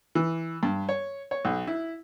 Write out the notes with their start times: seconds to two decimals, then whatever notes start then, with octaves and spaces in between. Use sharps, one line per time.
0.15 E3
0.63 G2
0.89 C#5
1.31 C#5
1.45 B1
1.67 E4